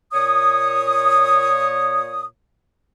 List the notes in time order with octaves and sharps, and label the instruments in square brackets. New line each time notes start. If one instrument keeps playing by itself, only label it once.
[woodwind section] A#2 C#5 D#6